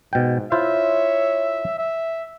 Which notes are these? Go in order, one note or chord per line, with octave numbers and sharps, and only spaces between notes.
G#2 B2 G5
E4 F4 C5 C#5 E5
E5